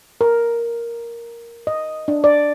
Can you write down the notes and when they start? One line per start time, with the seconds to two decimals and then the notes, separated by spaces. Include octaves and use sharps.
0.21 A#4
1.67 D#5
2.08 D4
2.24 D5